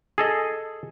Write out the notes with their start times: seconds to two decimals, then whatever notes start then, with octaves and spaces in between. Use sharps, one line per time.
0.18 G#4 A4 D#5